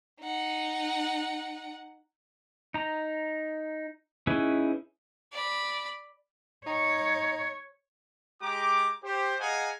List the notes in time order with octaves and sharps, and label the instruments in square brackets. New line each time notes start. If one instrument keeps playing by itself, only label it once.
[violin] D#4 F#5
[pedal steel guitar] D#4 A#5
C#4 D#4 E4 G#4 B4
[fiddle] D5 B5
[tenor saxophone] D#4 [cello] C#5
[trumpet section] G#3 G4 A#5 D6
G4 C5
G#4 D#5 F5 F#5 G#5 A#5